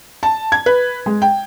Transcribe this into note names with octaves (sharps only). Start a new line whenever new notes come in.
A5
G#6
B4
G#3
G5